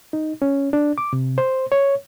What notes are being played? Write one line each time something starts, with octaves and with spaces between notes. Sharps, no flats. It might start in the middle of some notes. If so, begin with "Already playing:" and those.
D#4
C#4
D4
D6
C3
C5
C#5